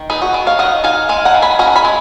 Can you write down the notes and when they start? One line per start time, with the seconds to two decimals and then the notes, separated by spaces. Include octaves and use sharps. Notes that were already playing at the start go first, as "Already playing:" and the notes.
Already playing: D#3
0.10 D#4 G#4 B4
0.22 F#4
0.34 D#3
0.47 C#5 F5
0.59 D#3 D#5 F#5
0.84 D#4 F5 G#5
1.09 G#3 F5 G#5
1.25 F#5 A#5
1.34 D#3
1.42 G#5 B5
1.59 C#4 F#5 A#5
1.76 G#5 B5
1.85 G#3